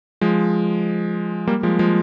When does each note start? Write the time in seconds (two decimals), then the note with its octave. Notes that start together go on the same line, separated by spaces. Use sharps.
0.21 F3 G#3
1.47 G3 A#3
1.63 F3 G#3
1.79 F3 G#3